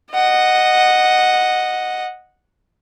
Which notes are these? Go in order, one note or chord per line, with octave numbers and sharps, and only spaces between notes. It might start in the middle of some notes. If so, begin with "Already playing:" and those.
D#5 F#5